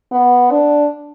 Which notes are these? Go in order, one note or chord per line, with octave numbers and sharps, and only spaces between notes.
B3
D4